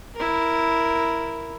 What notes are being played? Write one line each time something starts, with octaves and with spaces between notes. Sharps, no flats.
E4 A#4